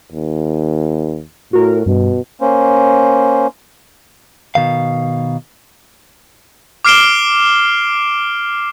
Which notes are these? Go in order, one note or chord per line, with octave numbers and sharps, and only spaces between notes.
D#2
A2 F#4 A#4
G2 B2
A#3 C#4 C5
B2 D#3 F5
D6 F6 C7 D7 E7 G7